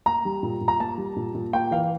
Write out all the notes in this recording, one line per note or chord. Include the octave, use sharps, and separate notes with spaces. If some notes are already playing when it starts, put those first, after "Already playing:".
A#3 A#5
G3
A#2
A#2
A#5
A#3 A5
G3
A#2
A#2
A#3 G5
E3 F5